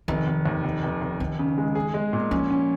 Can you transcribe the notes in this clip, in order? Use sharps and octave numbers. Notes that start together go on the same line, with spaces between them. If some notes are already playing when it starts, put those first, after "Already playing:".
F1 D#3
F1
D#2
F1
F1
F1
F1 D#3
C#3
G#3
G#4
G#3
A#2
F3 C#4
C#4